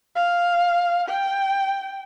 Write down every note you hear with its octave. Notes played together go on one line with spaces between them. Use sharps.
F5
G5